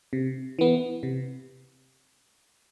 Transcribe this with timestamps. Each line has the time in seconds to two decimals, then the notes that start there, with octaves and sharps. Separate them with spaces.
0.13 C3
0.59 E3 B3
1.03 C3